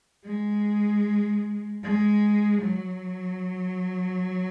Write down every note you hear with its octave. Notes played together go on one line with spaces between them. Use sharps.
G#3
G#3
F#3